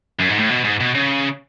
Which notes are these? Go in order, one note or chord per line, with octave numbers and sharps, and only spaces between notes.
F#2
G#2
A2
B2
G#2
B2
C#3